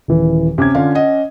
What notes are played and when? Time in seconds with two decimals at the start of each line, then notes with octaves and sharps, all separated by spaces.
0.08 D#1 E3
0.58 C3 C#4 D6 G#6
0.75 D3 F4 F5
0.95 D#5 F#5